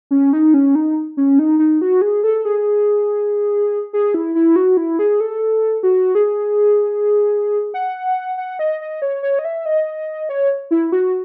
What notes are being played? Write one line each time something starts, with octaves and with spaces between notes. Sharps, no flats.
C#4
D#4
C#4
D#4
C#4
D#4
D#4
F#4
G#4
A4
G#4
G#4
E4
E4
F#4
E4
G#4
A4
F#4
G#4
F#5
F#5
D#5
D#5
C#5
C#5
D#5
E5
D#5
C#5
E4
F#4